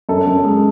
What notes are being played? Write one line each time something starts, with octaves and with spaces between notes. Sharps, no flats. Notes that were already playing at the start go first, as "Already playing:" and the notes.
F#2 A4
F#2
G#3